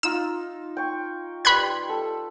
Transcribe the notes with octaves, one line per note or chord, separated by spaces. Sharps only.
D#4 F4 E6
G5 C#6
G3 B4 B5 C6 F#6 G#6
A4